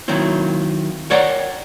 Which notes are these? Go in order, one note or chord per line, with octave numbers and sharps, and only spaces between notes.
D#3 F#3 A#3 C4 E4
A#4 C#5 D5 F#5 G5 A#5